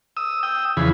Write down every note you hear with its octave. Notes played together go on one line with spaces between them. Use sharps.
D#6 E6
G5 D#6 E6
E2 C#3 E3 F3 G#4 B5